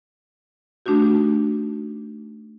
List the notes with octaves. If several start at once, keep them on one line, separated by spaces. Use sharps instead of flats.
A3 D4 D#4 F#4 G4